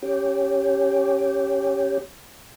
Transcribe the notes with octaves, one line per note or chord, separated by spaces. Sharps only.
C#4 G4